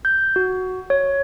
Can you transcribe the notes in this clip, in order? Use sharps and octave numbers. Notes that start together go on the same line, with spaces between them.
G6
F#4
C#5